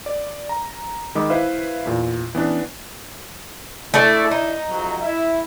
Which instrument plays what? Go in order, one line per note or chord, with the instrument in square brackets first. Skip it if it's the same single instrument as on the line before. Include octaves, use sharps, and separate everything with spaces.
[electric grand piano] D5
A#5
D#3 G#3 D#5 B5 D6
E4 B4 C5 E5 F5
E2 A#2
E3 B3 C#4 D4
[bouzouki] A3 A4 D5 [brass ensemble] D4 E4
[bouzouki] D#4
[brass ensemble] F2 C3 F#3
E4 E5